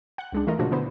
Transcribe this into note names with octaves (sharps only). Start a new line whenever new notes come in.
F#5 F#6
C#2 G#3 D4
E3 A3 F4 A#4 D#5
A#2 C#3 F3 D4 F#4
D3 B3 E4 B4 C5